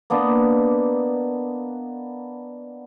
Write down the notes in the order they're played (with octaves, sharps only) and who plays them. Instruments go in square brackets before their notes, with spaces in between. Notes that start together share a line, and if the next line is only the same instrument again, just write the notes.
[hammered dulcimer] A#3 B3 D4 D#5